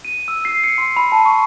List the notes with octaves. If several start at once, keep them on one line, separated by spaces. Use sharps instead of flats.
D#7
E6
C7
C#7
C6
B5
A5
C#6